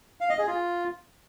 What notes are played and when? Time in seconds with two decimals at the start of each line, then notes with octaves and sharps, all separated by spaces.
0.21 F5
0.30 D#5
0.38 G#4
0.47 F4